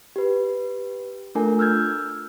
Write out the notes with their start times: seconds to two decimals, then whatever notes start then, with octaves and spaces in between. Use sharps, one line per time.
0.16 G4 B4
1.35 A3 D4 F4 A4 A#4 G#5
1.59 E6 F6 G6 G#6